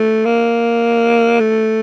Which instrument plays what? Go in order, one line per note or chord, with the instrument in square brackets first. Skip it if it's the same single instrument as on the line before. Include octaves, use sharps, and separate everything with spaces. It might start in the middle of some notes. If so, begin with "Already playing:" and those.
Already playing: [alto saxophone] A3
A#3
A3